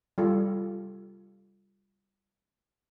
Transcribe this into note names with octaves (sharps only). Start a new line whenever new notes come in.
G3 F4 A4